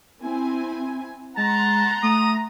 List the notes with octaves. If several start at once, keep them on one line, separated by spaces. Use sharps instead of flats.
C4 E4 G#5
G#3 F#5 A5 A#5 C6
A3 D#6